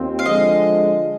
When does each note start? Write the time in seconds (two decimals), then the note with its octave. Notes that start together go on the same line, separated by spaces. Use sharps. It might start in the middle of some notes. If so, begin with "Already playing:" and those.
Already playing: D#2 C4 F4
0.19 F5
0.25 D3 F3 G#3 D#5